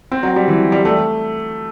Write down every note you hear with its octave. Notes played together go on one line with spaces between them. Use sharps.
C4
F#3
G3
E3
G3
A3